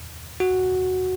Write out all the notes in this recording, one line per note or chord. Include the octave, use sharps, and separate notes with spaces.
F#4